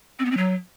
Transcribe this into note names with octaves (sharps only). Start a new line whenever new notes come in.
C4
B3
C4
F#3